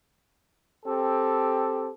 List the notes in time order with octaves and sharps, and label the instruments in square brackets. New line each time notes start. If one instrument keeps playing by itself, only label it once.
[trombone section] C4 G4 A4